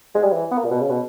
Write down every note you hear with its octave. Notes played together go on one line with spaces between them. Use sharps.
G#3
G3
E3
B3
A#3
A#2
B2
C#3
B2